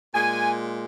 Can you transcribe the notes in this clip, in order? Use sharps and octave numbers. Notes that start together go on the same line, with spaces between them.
A#2 G#3 G#5